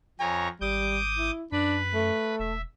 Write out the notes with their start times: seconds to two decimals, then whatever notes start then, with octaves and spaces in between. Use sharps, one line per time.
0.20 F2 C#5 G#5 A#5
0.61 G#1 G3 D6 D#6 G6
1.18 E4
1.52 F#2 D4 B4 B5
1.94 A3
2.40 E1 E5